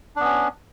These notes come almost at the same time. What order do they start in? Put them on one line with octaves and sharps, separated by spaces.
D4 B3 C#4